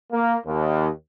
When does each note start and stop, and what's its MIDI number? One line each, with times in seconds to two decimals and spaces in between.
0.11 0.36 58
0.45 0.87 39